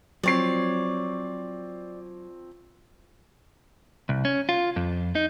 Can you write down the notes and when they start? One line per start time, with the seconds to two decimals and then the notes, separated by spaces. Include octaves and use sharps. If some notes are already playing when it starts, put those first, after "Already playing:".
0.23 F3 F#3 C4 C#5 D5 C7
4.09 C2
4.25 C#4
4.49 F4
4.76 F2
5.15 D#4